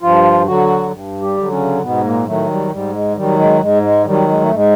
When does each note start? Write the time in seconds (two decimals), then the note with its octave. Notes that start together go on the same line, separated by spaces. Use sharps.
0.02 G2 F3 F4
0.47 D3 F#3 F#4
0.91 G2
1.21 G3 G4
1.37 D3 F#3
1.51 C#3 C#4
1.82 G#2 B2 B3
2.04 A#2 A#3
2.26 A2 D#3 F#3 A3
2.49 G3
2.71 G#2 G3
2.93 G#3
3.15 D#3 F#3 G3
3.38 G#3
3.61 G#2 G#3
3.83 G#3
4.05 D#3 F#3 G3
4.29 G#3
4.41 A3
4.50 G#2
4.55 G#3